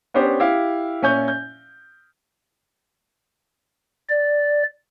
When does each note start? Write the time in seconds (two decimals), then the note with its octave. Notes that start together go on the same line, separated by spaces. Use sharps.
0.14 B3 C#4 D4 G4 C5
0.40 E4 G4 F5
1.02 A#2 C#4 E5 G#5 C#6 G6
1.28 G6
4.09 D5